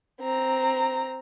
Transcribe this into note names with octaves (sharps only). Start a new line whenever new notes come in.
C4 A#5